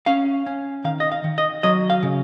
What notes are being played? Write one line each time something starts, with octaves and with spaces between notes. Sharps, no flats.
C#4 F5
C#4
D#3 F5
D#5
F5
D#3
D#5
F#3 D#5
F5
C#3